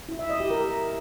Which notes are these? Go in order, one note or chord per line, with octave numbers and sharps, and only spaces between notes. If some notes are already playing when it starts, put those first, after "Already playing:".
E4
E5
D#5
G4
A#4